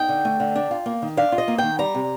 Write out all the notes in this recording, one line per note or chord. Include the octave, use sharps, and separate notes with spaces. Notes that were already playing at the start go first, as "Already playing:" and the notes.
Already playing: D#4 G5
D3
A3
D3
D4
F4
A#3
D#3
D4 F5
F4
D#5
A#3
D#3 G5
G3 A#5
C3